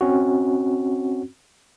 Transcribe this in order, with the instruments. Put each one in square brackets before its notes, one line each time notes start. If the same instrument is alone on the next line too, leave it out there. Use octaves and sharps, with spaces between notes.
[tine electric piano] C4 C#4 F#4